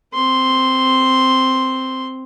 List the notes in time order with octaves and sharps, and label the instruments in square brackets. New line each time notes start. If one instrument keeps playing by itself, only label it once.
[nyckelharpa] C4 C6